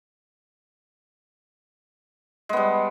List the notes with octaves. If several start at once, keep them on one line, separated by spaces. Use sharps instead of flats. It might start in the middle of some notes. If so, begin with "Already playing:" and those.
G3 G#3 B3